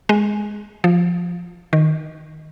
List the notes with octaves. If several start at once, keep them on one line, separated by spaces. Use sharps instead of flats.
G#3
F3
D#3